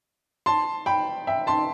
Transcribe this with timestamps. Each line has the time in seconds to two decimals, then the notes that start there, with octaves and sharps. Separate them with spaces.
0.46 A5 C6
0.86 G5 B5
1.27 E5 G5
1.47 A5 C6